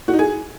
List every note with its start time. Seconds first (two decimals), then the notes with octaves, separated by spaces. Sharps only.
0.08 F#4
0.13 D#4
0.19 G#4